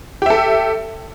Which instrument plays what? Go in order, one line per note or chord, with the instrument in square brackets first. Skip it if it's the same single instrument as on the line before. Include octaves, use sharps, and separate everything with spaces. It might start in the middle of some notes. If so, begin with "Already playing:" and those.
[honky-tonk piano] G4
E5
A4